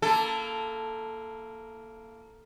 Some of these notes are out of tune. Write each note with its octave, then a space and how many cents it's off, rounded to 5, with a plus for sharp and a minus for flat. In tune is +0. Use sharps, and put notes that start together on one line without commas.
A#3 +0 E4 +35 A4 +0